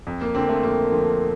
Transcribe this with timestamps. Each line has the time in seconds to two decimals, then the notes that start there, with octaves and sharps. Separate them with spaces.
0.07 F2
0.21 A#3
0.35 D3 F3 C4
0.49 A3
0.63 F2 A#3
0.91 D3 F3